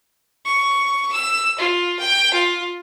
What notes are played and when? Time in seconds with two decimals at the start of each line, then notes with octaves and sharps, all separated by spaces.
0.45 C#6
1.12 E6
1.58 F4
1.99 G5
2.33 F4